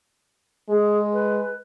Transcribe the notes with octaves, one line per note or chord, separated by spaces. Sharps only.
G#3 G#4
B4